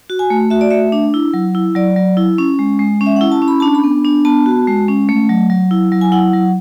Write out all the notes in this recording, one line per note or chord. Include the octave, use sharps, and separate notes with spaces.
F#4
G#5
A3
F#4 E5
D5
A3 E5
D4
E4
F#3
E4
F#3 D5
F#3
E4
C#4
G#3
G#3
C#4
E5
F#5
E4
A5
C#4
B5
D4 A5
B5
B3
D4
B3 A5
F#4
G#3
C#4
A3
F#3
F#3
E4
F#3
G#5
E4 F#5
F#3